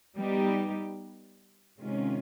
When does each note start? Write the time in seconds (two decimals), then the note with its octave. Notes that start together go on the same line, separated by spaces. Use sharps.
0.17 G3 B3 D#4 G4
1.79 C3 D#3 G#3 C#4 F4